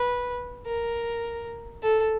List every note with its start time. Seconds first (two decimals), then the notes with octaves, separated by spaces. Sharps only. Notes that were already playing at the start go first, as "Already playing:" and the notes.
Already playing: B4
0.66 A#4
1.82 A4